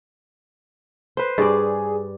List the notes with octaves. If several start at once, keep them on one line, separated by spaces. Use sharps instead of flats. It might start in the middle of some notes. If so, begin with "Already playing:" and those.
B4 C5
G2 G#4 D5